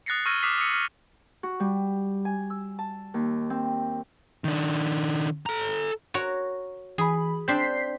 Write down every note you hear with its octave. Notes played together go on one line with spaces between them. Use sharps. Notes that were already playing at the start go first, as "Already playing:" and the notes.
D#6 F#6 A6 A#6 C7 C#7
C#6 E6 F6 G#6 A#6 D#7
D6 D#6 F6 F#6 B6 C7
D#6 E6 C#7
F6 C7
F#4
G3
G#5
E6
A5
D#2
C4
D#3 D4
A4 A#5
F#4 A#4 C#5
E3 G#4 B5
C4 D4 G6 B6 C7